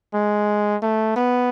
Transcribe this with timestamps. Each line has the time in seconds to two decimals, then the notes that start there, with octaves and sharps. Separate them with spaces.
0.14 G#3
0.83 A3
1.16 B3